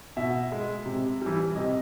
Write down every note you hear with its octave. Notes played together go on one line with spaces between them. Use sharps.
B2 E5
G#3
C3
E3 G3
C3 D#5